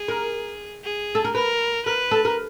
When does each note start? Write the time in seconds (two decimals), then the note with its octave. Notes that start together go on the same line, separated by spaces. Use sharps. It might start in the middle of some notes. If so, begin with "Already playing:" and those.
Already playing: G#4
0.08 A#4
0.84 G#4
1.15 A4
1.25 A#4
1.35 A#4 B4
1.85 A#4 B4
2.11 A4
2.25 A#4